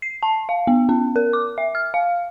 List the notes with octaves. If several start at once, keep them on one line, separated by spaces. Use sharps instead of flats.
C7
A5
F5
B3
C#4
A#4
D6
E5
F6
F5